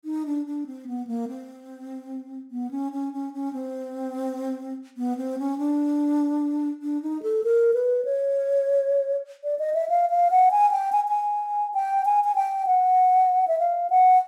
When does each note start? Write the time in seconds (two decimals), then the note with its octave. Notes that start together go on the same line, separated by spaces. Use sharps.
0.05 D#4
0.26 D4
0.46 D4
0.66 C4
0.87 B3
1.07 A#3
1.28 C4
2.51 B3
2.71 C#4
2.92 C#4
3.13 C#4
3.33 C#4
3.53 C4
4.97 B3
5.17 C4
5.39 C#4
5.58 D4
6.82 D4
7.02 D#4
7.23 A4
7.44 A#4
7.74 B4
8.05 C#5
9.44 D5
9.59 D#5
9.74 E5
9.89 F5
10.10 F5
10.31 F#5
10.51 G#5
10.72 G5
10.92 G#5
11.08 G#5
11.74 G5
12.05 G#5
12.24 G#5
12.35 G5
12.66 F#5
13.48 E5
13.59 F5
13.90 F#5